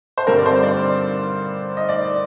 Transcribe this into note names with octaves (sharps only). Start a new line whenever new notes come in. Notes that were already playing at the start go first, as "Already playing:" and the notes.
C5
G2 D3 G3 C4 A#4
D5
C5
D5
D#5
D5